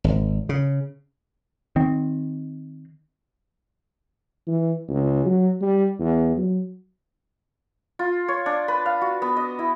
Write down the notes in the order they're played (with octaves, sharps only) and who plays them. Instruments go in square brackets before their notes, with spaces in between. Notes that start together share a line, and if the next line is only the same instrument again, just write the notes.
[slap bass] G#1
C#3
[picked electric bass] D#3 C4
[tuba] E3
C#2
F#3
G3
E2
F#3
[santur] F4
C#5
D4
B4
F5
F#4
B3
D#5
E4